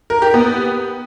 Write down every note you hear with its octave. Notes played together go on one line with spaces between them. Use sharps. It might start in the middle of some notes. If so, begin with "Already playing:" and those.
A#4
G4
B3